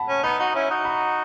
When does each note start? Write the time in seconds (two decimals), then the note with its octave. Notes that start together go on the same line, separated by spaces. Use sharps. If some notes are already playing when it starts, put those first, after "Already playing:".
Already playing: F#5 A5 B5
0.09 C#4
0.23 B3 D#4 B5
0.39 D#4 F#4
0.55 C#4 E4
0.71 D#4 F#4
0.85 B5